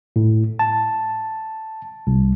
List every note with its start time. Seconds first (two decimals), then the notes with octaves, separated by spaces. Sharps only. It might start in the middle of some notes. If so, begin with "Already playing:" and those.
0.16 A2
0.59 A5
2.07 C2